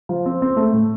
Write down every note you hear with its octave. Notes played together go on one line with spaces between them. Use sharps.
F3
C4
C4
A3
A2